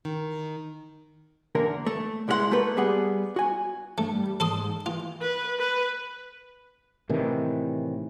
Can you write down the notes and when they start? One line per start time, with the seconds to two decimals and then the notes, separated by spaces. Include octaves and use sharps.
0.05 D#3
1.55 E2 D3 A#3 A#4
1.86 A3
2.28 C2 G#3 E4 F4 F#5 C6
2.51 A3 A#3 A4 B4
2.77 G3 B3 G#4 F#5
3.36 F#4 G#5
3.98 G2 A3
4.13 G3
4.40 G#2 A4 C6 D#6
4.86 E3 F4
5.21 B4
5.59 B4
7.09 A2 C3 D#3 E3